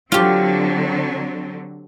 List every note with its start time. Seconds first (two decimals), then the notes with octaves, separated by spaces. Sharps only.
0.12 D3 F#3 C4 F4 G4